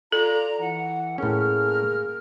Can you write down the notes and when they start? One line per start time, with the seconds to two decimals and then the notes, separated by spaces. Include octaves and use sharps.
0.12 F4 A4 D5 A#5
0.60 E3 F#5
1.18 A2 A#3 C#4 G#4 F6